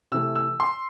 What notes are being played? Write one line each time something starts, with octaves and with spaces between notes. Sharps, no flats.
C3 E3 A3 E6
E6
C6